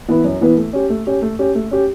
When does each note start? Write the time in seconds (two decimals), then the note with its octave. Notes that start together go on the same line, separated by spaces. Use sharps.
0.08 E3 B3 E4 B4
0.24 F#2
0.41 E3 B3 E4 B4
0.57 A3
0.73 C#4 G4
0.90 A3
1.07 C#4 G4
1.22 A3
1.39 C#4 G4
1.55 A3
1.71 C#4 G4